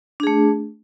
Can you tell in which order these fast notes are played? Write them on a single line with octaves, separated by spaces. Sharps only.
D4 G#4 A3